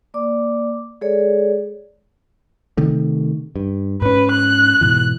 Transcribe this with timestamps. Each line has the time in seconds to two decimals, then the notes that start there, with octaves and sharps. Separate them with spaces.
0.14 A#3 D5 D6
1.01 G#3 G#4 A4 C#5 D5
2.77 C3 D#3 A3
3.56 G2
4.02 G#2 C#4 B4
4.32 F#6
4.81 G#2 B2 E3